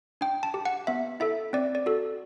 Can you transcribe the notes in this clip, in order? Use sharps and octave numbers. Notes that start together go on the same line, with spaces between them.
D4 G5
A5
G4
F#5
B3 E5
E4 A4 E5
C4 D5
D5
F#4 A4